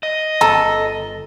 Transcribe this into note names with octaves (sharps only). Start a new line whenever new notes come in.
D#5
G1 A4 A#5